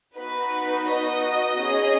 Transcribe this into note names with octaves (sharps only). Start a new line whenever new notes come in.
B3 D#4 F#4 B4
D#5
C#4 G#4